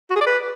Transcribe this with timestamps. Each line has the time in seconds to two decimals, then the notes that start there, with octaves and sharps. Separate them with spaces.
0.10 F#4
0.16 G#4
0.21 D5
0.26 B4